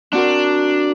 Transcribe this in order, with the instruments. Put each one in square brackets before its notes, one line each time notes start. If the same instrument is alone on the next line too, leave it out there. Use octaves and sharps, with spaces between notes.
[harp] C4 F#4 A#4 [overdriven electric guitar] D4